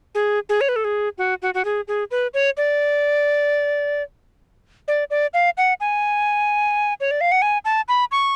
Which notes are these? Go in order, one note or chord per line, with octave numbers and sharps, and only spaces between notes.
G#4
G#4
C#5
B4
A4
G#4
F#4
F#4
F#4
G#4
G#4
B4
C#5
D5
D5
D5
F5
F#5
G#5
C#5
D5
F5
F#5
G#5
A5
B5
C#6